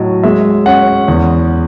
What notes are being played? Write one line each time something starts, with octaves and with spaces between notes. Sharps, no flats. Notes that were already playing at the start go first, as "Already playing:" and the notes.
Already playing: A2 F#3 D#5
G#3 E5
C#4 F#5
E2